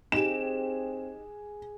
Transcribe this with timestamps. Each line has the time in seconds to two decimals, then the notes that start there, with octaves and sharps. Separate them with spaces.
0.12 C4 D#4 G4 G#4 E7